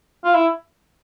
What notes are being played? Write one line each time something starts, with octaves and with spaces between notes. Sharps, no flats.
F4
E4